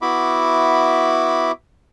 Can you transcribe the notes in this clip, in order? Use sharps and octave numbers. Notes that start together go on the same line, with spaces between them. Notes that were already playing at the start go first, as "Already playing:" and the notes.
B3 E4 F#4 E5 B5 D6